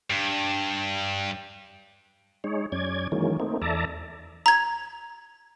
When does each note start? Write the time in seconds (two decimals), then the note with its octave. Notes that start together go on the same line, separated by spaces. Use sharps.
0.10 G2
2.44 G#3 D#4 C#5
2.72 F#2 C#4 D5 G#6
3.12 D#3 E3 F#3 G#3 A#3 C#4
3.40 A3 A#3 C4 D#4
3.62 E2 A4 D5 E5 A5 A#5
4.46 A#5 G#6